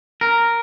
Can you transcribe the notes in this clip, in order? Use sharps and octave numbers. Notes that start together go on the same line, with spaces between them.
A#4